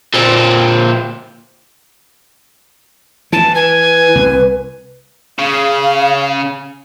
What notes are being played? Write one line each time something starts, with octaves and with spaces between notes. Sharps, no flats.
A#2 C4
E3 A5
B4 G#5
C2
C#3 F5